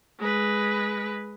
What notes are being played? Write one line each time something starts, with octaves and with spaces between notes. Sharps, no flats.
G#3 B4